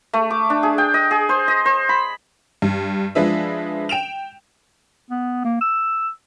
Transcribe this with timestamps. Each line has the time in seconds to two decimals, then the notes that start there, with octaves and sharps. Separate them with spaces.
0.14 A3
0.30 D6
0.50 D4
0.63 G#4
0.78 G5
0.94 D#5
1.11 G#4
1.29 C5
1.48 D#5
1.65 C5
1.89 B5
2.62 G2
3.15 F3 G#3 D4 B4 E5
3.89 G5 D7 E7 F7
5.10 B3
5.45 A#3
5.61 E6